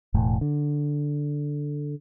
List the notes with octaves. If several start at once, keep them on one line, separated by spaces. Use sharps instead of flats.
E1 A2
D3